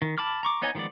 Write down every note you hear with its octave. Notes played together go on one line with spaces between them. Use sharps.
D#3
A5 B5 D6 F6
A#5 C#6 D6
B3 D#4 C#5 D#5 G#5
D#3 F3 G#3 B3 D5